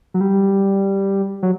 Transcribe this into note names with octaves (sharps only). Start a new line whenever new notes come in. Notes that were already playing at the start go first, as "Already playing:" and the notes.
F#3
G3
F#3